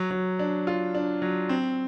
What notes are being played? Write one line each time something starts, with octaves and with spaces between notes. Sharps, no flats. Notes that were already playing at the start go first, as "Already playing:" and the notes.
Already playing: F#3
F#3
D4
F4
D4
F#3
C4